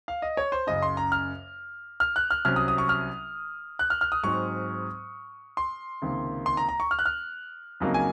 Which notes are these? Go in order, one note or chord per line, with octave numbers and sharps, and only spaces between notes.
F5
D#5
C#5
C5
F#1 F#2 C#3 D#5
C6
A#5
F6
F6
F#6
F6
C2 C3 F#3 C#4 F6
D#6
D#6
C#6
F6
F#6
F6
F6
D#6
G#2 F#3 C4 D#4 C#6
C6
C#2 C3 D#3 A#3
C6
A#5
A#5
C#6
F6
F#6
F6
F2 C#3 F#3 A#3 D#4
G#5